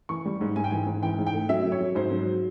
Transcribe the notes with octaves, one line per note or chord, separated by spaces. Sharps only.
E3 C#6
G3
G#2
G#2 G#5
G5
E3 G#5
G#2
E3 G5
G#2
G5
A3
F#3 E5
F#3
C#5
F#3
G#2 C5
F#3